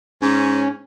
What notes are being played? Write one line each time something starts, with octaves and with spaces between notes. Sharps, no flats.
G#2 C#4